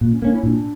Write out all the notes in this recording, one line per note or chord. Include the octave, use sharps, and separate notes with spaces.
A#2 A#3
C#4
A#3 C#4 D4
E4
A#2 D4